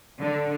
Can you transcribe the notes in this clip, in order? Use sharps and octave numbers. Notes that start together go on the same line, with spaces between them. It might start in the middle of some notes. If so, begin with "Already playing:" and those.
D3